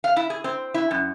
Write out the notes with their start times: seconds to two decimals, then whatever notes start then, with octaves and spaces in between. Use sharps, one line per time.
0.04 F5
0.16 E4
0.30 G#4
0.44 C4
0.74 E4
0.91 F#2